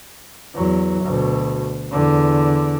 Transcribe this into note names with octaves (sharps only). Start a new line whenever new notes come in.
E2 F#3
D2 B2
E2 D3